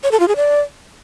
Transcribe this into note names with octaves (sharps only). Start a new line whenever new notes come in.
C#5
A4
F4
G#4
D5